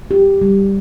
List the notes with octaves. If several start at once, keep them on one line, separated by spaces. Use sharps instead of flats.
G4
G3